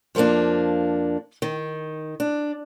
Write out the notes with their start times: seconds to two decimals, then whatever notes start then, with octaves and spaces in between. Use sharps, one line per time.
0.15 F2 F3 A3 A#3 D4
1.42 D#3
2.20 D4